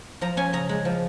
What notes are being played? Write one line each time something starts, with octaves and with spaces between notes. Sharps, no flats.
F3 A#5
C#4 G#5
C#3 A#5
G#3
F3